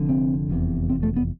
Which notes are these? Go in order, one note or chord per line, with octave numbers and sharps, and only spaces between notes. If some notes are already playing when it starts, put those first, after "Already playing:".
Already playing: F1 F2 D3
C4
F1 E2 C3
C4
A3
B3